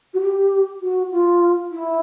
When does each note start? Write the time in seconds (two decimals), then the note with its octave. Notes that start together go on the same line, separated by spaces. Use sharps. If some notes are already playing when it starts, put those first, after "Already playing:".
0.14 F#4
0.22 G4
0.82 F#4
1.12 F4
1.72 E4